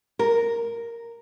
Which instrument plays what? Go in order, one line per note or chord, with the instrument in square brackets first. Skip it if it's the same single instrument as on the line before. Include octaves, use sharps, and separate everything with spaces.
[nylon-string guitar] A#4